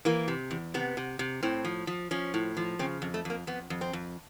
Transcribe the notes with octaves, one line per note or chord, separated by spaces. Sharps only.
E3 A#3
C3
E2
C3 B3
C3
C3
A2 C4
F3
F3
F3 C#4
A2
F3
C#3 C4
F2
A3
F2 A#3
F2 B3
F2
C4
F2